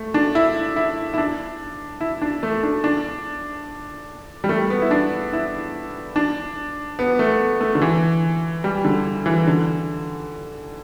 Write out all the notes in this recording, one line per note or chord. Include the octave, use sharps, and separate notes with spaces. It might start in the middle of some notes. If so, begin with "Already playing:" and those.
Already playing: A3
D4
E4
E4
E4
D4
E4
D4
A3
D4
D4
G3
A3
B3
E4
D4
E4
D4
B3
A3
A3
D3
E3
G3
D3
E3
D3